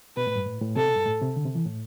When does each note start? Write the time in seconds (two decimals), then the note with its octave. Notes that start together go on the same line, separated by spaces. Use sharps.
0.17 B2 B4
0.27 A2
0.36 G2
0.46 A2
0.61 A2
0.76 C3 A4
0.86 B2
0.96 G2
1.05 A2
1.21 C3
1.36 D3
1.45 C3
1.55 E3
1.66 A2